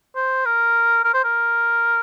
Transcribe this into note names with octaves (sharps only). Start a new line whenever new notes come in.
C5
A#4
A#4
C5
A#4